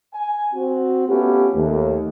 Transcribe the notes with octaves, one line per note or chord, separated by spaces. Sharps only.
G#5
C4 F#4
A3 B3 C#4 F4 G4
D#2 A3